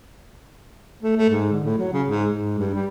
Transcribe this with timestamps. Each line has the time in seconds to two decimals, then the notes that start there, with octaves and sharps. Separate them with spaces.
1.03 A3
1.17 A3
1.30 G#2
1.52 D3
1.64 A2
1.78 F#3
1.93 C#3
2.08 G#2
2.30 G#2
2.59 G2
2.74 G3